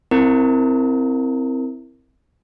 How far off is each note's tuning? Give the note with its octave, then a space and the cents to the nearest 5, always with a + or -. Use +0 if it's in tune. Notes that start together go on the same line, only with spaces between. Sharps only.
C4 +0 E4 +0 A#4 -10